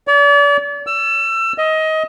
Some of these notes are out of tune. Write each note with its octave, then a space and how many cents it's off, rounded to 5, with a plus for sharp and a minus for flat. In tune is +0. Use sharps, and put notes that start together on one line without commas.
D5 -40
E6 +25
D#5 +20